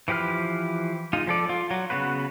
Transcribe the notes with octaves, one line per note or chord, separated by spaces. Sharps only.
E3 F3 G4 B4 F6
G#3 D#4 F4
F3 A4 D5
F4
F#3
C#3 B3 F#4 B4